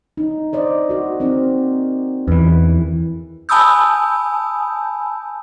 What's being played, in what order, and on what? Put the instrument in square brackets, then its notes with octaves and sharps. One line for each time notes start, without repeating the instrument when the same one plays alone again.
[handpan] D#4
C5 D5 D#5
F#4 A#4
C4 D#4 A#4
[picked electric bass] E2 E3 [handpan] B4
[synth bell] G#5 A5 B5 D#6 E6 G6